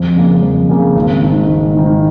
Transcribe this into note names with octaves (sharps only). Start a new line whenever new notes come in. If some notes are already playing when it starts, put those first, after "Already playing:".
Already playing: F2
C#3 A#3
F2
C#3 A#3
G#1
G#2 D#3
G#1
G#2 D#3